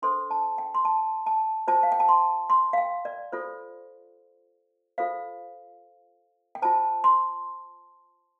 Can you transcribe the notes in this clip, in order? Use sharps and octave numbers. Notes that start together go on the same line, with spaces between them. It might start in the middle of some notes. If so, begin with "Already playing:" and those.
D4 A4 C5 C6
A5
G5
C6
A5
A5
F4 C5 A5
F5
G5
A5
C6
C6
F5
G5
D5
F4 A4 C5
F4 A4 C5 F5
G5
F4 C5 A5
C6